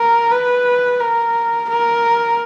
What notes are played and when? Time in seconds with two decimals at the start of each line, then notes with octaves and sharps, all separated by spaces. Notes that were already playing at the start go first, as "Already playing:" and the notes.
Already playing: A#4
0.32 B4
1.00 A#4
1.69 A#4